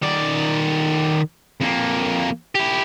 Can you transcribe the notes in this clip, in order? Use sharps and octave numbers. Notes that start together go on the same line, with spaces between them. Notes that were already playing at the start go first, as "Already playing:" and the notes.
D#3 D5
F2 A#3
E4 G4